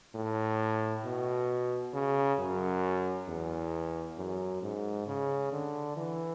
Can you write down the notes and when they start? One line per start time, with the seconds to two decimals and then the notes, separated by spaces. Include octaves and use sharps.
0.15 A2
1.04 B2
1.93 C#3
2.39 F#2
3.28 E2
4.18 F#2
4.62 G#2
5.07 C#3
5.52 D3
5.96 E3